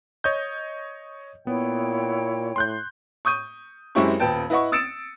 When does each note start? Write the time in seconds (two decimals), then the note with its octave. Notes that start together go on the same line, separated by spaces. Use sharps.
0.24 C#5 D#5 G6
1.47 A#2 B3 E4 C#5 G5
2.56 A2 C6 F#6 G6
3.25 C#6 D#6 G6 D#7
3.95 F#2 G#3 C4 E4 G4 C#6
4.20 D#1 B3 G5 A5
4.50 E4 B4 D#5 F#5 C#6
4.72 D#6 E6 A6 C#7 D7 E7